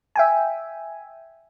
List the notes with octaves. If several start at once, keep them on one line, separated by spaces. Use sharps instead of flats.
E5 G5 G#5